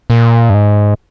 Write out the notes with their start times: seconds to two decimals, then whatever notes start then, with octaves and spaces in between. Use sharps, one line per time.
0.10 A#2
0.50 G2
0.54 G#2